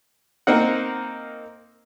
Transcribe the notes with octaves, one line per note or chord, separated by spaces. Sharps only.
A#3 C4 D#4 A#4 F#5